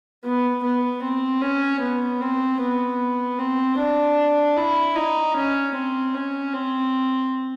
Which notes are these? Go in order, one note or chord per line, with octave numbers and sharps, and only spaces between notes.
B3
B3
C4
C#4
B3
C4
B3
C4
D4
E4
D#4
C#4
C4
C#4
C4